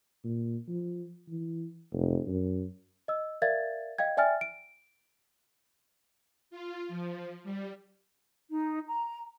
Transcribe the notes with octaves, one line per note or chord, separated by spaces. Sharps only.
A#2
F3
E3
F1
F#2
D#5 E6
A#4 D5 E5 F5 G#6 A6
D#5 F5 G5 G#6
D5 E5 G5 G#5 F6 A6
D7
F4
F3
G3
D#4
A#5